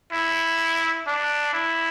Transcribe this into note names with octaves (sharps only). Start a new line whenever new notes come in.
E4
D4
E4